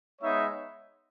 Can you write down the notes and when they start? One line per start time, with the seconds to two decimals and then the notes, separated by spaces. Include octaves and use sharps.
0.22 G#3 B3 D#4 C#5 E5